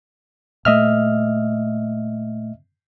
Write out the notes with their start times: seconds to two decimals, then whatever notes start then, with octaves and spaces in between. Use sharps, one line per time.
0.65 A#2 A3 D#5 E5 F6